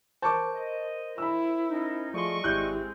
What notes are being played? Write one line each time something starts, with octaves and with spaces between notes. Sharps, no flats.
A#4 C5 A5 C#6 D6
D#5
E4 B5 E6
C#4 D#4
F3 A3 G#4 D5 D#5 C6 C#6
G#1 G#3 C4 E4 G4 F#6 G6